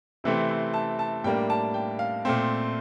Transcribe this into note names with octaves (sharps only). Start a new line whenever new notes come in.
C3 E3 A3 C4
C6
A5
A5
A2 G3 A#3 D4 G5
A5
G5
F5
A#2 A3 C4